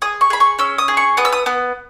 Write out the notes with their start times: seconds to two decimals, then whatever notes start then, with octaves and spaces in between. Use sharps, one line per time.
0.02 G#4 D#6
0.21 C#6
0.30 G#4 B5
0.40 C#6
0.59 C#4 E6
0.78 D#6
0.88 G#4
0.97 C#6
1.17 B3 D#6
1.25 E6
1.32 D#6
1.46 B3